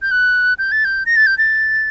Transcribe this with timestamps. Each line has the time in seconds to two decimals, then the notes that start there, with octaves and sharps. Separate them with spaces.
0.02 G6
0.11 F#6
0.58 G6
0.72 A6
0.85 G6
1.06 A#6
1.16 A6
1.26 G6
1.38 A6